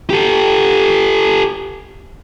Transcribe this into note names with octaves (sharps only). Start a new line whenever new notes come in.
G4 A4